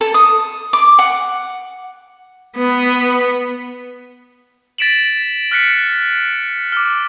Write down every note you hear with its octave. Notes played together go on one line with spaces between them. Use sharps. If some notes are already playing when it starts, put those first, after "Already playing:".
A4
D#6
D6
F#5
B3
A6 B6 D7 E7 F#7
F6 F#6 B6 C#7
D6 F6